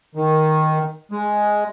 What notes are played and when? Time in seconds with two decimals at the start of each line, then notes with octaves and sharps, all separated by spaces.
0.15 D#3
1.12 G#3